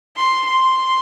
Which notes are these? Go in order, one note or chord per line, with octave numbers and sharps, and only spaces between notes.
C6
C6